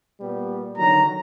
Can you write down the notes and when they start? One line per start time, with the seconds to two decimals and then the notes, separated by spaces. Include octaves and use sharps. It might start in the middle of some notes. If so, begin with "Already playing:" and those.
0.21 A#2 G3 B3
0.78 D3 D#3 F#3 A#5